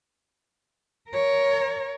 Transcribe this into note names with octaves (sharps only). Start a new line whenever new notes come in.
A#4 C#5